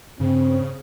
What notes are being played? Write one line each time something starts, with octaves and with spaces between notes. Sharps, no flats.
G2 C#3 C4